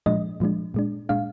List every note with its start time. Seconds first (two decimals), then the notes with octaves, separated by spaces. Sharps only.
0.06 A#2 F3 G#3 D4 D#5
0.40 A#2 F3 G#3 D4
0.74 A#2 G#3 D4
1.09 A#2 G#3 D4 F5